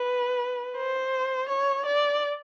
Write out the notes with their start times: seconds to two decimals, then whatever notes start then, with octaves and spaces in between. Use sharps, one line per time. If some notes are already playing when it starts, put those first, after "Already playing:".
Already playing: B4
0.76 C5
1.49 C#5
1.86 D5